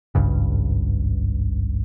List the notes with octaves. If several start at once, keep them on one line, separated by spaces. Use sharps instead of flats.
G#1 C#2 G2 C#3